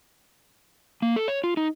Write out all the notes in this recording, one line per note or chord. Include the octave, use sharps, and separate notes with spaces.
A#3
A4
C#5
F4
D#4